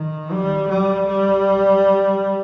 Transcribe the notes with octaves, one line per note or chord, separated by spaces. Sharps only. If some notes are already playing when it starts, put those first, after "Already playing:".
Already playing: D#3
G3
G3
G3